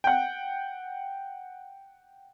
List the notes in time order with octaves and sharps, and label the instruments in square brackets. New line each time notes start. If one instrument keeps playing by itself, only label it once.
[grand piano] F#5 G5